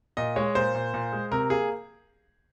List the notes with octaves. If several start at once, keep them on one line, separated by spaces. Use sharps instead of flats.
A#2 D#5
G#3 C#5
A#2 C5
A#2
A#2
G#3
C3 A#4
A#3 G#4